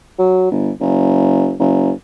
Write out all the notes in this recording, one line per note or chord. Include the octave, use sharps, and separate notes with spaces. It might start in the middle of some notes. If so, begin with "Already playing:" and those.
F#3
G1
F#1
F#1